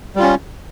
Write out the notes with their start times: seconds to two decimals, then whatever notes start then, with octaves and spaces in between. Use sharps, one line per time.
0.16 G3
0.19 F4
0.23 C#4